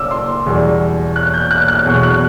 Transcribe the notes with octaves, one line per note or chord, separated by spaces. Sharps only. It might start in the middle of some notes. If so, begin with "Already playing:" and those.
Already playing: F#1 D6 E6
C6
E2 B2 G3
F#6
G6
F#6
F#6
E2 B2 F#3
F#6